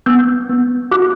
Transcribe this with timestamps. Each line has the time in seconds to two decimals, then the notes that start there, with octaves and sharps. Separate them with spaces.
0.06 B3 E6 G6
0.49 B3
0.91 F#4 D6 F#6